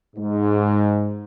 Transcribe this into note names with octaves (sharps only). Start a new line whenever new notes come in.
G#2